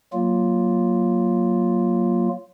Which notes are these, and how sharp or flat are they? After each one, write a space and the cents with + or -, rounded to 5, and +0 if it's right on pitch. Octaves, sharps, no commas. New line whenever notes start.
F#3 +0 A#3 +0 F4 +0